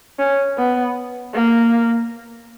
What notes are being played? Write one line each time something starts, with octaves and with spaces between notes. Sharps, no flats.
C#4
B3
A#3